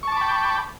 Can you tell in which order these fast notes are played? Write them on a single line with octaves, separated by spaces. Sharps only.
C#6 A5 D6 B5 G5